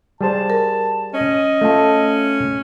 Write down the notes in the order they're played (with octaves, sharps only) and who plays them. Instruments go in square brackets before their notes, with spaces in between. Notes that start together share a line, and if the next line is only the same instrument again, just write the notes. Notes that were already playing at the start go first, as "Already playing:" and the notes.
[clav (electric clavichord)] G3 G#4 C5 [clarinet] A5
[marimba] A#4
[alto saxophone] C#4 [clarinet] D#5
[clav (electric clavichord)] A3 F4 A4